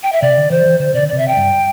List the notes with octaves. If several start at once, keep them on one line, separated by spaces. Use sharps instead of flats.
G5
E5
C3 D5
D3
E3 C5
E3
D3 C5
C3 D5
D3
C3 D5
E5
G5
G2